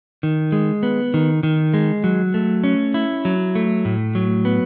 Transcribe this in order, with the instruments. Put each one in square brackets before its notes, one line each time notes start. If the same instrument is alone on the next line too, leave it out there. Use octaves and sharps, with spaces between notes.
[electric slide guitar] D#3
G#3
B3
D#3
D#3
G#3
F#3
A3
C#4
E4
F#3
A3
A2
F#3
B3